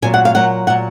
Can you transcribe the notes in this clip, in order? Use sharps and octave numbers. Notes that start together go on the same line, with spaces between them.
A#2 F#3 G#5
F#5
F5
A#2 F#3 F#5
A#2 F#3 F#5